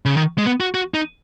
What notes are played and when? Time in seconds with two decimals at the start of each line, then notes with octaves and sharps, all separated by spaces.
0.05 C#3
0.17 D#3
0.38 G#3
0.46 B3
0.60 F#4
0.75 F#4
0.94 D#4